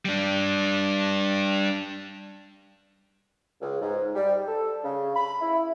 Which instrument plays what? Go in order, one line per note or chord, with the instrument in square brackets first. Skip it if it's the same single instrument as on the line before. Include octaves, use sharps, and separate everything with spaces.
[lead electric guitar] G3 D4
[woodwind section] C#2
G#2
G3
A4
C#3
B5
E4